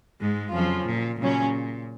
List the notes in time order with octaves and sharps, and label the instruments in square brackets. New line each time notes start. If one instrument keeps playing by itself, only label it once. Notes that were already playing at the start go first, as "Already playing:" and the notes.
[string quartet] G#2 G#3
[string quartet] F2 F3 [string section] C#3 F#3 C#4 F4
[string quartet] A#2
[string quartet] A#2 [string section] C#3 F#3 C#4